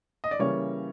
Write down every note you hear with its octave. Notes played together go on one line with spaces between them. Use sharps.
D#5
D5
C#3 E3 G3 A#3 C#5